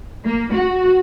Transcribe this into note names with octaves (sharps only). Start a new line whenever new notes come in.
A#3
F#4